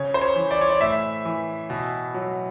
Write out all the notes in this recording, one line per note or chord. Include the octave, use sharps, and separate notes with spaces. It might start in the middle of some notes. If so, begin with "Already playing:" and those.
Already playing: C#3 C#5
C5
C#5
E3
D5
C#5
D5
A2 E5
E3
B2
F#3